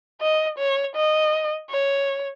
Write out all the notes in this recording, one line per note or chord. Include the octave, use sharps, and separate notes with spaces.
D#5
C#5
D#5
C#5